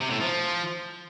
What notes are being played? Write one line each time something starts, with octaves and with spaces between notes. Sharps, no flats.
C3
A2
F3